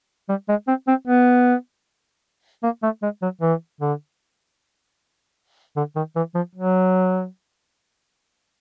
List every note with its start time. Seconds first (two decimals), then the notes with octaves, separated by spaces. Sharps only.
0.29 G3
0.49 G#3
0.67 C4
0.88 C4
1.07 B3
2.63 A#3
2.83 A3
3.03 G#3
3.22 F#3
3.41 E3
3.81 D3
5.77 D3
5.96 D#3
6.16 E3
6.35 F3
6.55 F#3